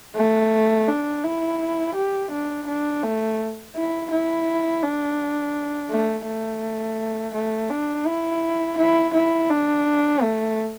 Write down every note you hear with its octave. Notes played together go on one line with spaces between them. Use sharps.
A3
D4
E4
G4
D4
D4
A3
E4
E4
D4
A3
A3
A3
D4
E4
E4
E4
D4
A3